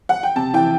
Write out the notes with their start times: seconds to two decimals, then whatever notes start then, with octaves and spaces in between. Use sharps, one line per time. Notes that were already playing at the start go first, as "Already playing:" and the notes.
0.09 F#5
0.23 G5
0.36 C3 A5
0.53 E3 G5